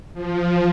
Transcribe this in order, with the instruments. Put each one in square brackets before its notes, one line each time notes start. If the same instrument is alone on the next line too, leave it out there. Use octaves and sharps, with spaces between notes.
[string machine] F3